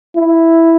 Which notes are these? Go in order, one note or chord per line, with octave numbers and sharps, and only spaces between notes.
E4